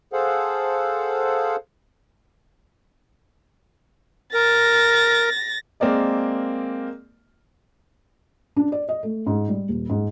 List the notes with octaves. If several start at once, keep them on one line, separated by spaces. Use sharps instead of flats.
G#4 A4 C5 F5 F#5
A#4 A6 A#6
G#3 A#3 C4 A#4 D5 D#5
D4
D5
D#5
A3
G#2
G3
D#1
G#2